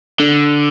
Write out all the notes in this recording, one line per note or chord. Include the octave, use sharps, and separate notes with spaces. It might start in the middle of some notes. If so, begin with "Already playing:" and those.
D3